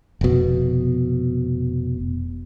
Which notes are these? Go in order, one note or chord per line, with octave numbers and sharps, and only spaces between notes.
F1 B2